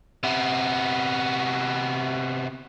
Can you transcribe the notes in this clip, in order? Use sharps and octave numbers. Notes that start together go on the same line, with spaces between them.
C3 B3